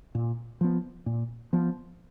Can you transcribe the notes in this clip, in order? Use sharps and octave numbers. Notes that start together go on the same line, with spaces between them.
A#2
F3 B3
A#2
F3 B3